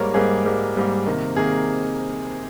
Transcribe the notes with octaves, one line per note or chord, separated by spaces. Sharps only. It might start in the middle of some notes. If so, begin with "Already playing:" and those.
Already playing: G#2 G3 A#3 A#4 C#5
G#2 G3 A#3 G#4
G#2 G3 A#3
G#2 G3 A#3
C3 D#3 A#3
C3 D#3 A#3 G#4